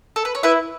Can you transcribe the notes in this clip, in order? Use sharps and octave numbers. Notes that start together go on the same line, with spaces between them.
A4
B4
C#5
E4 B4 E5